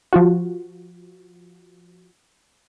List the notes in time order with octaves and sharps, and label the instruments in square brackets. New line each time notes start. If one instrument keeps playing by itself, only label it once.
[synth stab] F3 F4 F#4